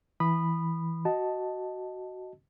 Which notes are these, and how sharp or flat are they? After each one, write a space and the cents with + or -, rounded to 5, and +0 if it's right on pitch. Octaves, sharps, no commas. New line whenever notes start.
E3 +0 B5 +0 D#6 -25
F#4 +10 D#5 +0 A5 +0